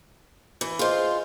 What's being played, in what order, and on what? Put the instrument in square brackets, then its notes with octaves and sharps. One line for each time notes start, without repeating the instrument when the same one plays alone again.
[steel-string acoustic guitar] E3
[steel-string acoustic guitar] F4 C5 [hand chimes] G#4 D#5